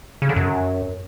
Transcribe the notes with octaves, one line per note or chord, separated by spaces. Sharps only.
C#3
D3
F#2